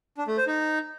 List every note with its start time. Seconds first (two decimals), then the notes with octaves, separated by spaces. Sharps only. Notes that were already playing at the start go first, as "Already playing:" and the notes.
0.17 D4
0.27 A3
0.37 C5
0.47 D#4